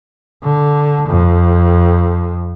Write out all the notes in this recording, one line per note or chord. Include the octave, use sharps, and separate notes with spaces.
D3
F2